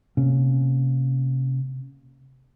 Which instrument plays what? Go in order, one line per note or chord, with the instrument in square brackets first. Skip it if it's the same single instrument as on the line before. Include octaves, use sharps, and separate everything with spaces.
[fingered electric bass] C3 A#3 C#4